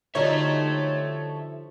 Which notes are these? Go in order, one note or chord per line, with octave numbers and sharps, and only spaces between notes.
D2 F3 G3 D#4 A4 C#5 E5